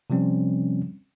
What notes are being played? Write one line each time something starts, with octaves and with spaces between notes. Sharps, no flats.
C3 F3 G3 C4 C#4